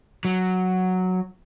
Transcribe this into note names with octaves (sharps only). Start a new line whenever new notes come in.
F#3